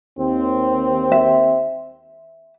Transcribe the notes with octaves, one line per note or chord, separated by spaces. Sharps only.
D#2 C4
E5